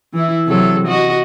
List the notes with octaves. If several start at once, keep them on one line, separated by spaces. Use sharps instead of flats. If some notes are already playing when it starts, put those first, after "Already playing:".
E3 E4
C3 F#3 A4
F#4 D#5